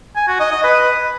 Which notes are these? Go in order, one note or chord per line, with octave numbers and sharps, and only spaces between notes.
G#5
F#4
D#5
D#5
B4